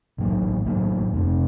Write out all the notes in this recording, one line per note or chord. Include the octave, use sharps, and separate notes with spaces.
A1 A2 F#3 A#3
A1 A2 F#3 A#3
F1 F2 C3